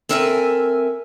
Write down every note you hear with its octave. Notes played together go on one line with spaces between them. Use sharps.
C4 A4 A#4 E5 G5 G#5